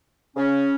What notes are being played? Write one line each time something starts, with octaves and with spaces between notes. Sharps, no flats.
C#3 C#4